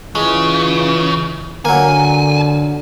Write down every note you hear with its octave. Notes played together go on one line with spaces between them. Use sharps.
C#3 E3 G#3 F4
D3 F#3 A#3 G#5